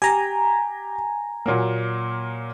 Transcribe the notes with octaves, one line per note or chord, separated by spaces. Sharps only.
G4 G#5 A#5
A#2 F#3 A#3